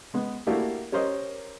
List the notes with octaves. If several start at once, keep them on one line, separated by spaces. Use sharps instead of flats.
G#3 B3
A3 A#3 D4 E4 F#4 G4
C#4 G4 A#4 C5 D#5